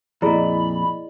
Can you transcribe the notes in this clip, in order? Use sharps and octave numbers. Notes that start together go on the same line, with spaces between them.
F2 A#2 E4 G#4 D5 D#5 B5